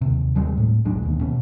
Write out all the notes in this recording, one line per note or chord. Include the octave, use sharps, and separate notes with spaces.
D#2 C3
D#2 G3 G#3 C4
A2
B1 E2 G#3 D4
E1 D#2
B2 C#4